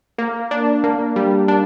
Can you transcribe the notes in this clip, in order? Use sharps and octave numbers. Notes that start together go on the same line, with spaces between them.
A#3
D4
A#3
G3
D4